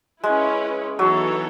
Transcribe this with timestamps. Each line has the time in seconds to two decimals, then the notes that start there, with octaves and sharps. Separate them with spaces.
0.24 G#3 C#4 E4 B4
0.99 E3 F#3 B3 D#4 A4 C#5